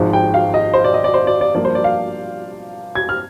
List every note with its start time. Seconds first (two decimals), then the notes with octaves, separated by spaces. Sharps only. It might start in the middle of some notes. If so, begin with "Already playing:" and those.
Already playing: G#1 G#2 F3 G#3
0.13 G5
0.34 F5
0.54 D#5
0.74 C5
0.84 D5
0.94 D#5
1.04 D5
1.14 C5
1.27 D5
1.41 D5
1.55 G2 F3 A#3 D5
1.65 C5
1.75 D5
1.84 F5
2.95 G#6
3.09 F6